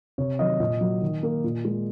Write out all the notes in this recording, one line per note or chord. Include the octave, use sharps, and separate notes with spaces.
C3 C#5
D#3 F#3 D#5
A#2 D#5
F#3 A#3
D#3
A#3
A#2
G#3